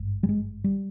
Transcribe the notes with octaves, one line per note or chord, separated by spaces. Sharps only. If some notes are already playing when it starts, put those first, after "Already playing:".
Already playing: G#1 G2
G3
G#3
G3